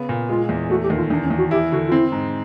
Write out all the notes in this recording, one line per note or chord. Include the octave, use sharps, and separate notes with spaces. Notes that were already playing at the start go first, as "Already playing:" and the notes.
Already playing: C#3 B3
A#2
G#3 F4
E2
A3 F#4
G4
D#2
F4
E2 D4
C#4
E2
F#4
E4 G4
D3 F#4
F4
C4 E4
G#2